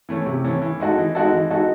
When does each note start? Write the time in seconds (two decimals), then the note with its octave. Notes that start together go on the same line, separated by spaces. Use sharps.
0.09 E3 A3 C#4
0.26 C3
0.44 E3 A3 C#4
0.62 E3
0.80 G#3 D#4 F#4 A4
0.98 E3
1.15 G#3 D#4 F#4 A4
1.33 E3
1.50 G#3 D#4 F#4 A4